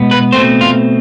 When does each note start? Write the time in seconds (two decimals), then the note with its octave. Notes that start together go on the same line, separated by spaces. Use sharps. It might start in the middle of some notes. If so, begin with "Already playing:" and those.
Already playing: B2 G#3 B3
0.11 B4
0.32 B2 A3 C4 C5
0.61 F4